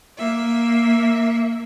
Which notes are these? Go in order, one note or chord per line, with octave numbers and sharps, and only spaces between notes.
A#3 E5